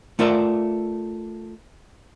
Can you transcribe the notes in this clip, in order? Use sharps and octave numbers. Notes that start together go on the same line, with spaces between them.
A3 F4 A#4 D5 E5